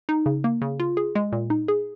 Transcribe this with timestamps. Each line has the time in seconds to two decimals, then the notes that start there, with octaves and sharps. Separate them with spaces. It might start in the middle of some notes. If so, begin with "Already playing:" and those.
0.09 D#4
0.26 C#3
0.44 A#3
0.62 C#3
0.80 F4
0.97 G#4
1.15 G#3
1.32 A#2
1.50 D#4
1.68 G#4